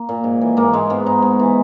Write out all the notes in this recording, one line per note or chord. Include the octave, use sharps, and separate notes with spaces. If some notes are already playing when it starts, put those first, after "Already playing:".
Already playing: A#3
A#2
G#2
E3
G#2 A#3
G#2 G#3
G#2 B3
G#2 D#4
G#2
E3